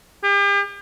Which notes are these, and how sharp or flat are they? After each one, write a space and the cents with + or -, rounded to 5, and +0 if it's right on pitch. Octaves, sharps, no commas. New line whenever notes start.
G4 +40